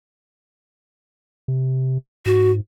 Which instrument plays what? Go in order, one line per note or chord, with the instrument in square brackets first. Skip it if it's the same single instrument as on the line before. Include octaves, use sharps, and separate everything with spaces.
[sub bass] C3
[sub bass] G#2 [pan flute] F#4